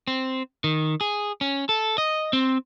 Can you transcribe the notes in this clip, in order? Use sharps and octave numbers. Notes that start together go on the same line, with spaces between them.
C4
D#3
G#4
C#4
A4
D#5
C4